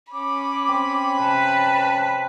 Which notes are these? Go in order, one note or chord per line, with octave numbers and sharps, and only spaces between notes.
C#4 B5 D6
C4
C3 B4 A5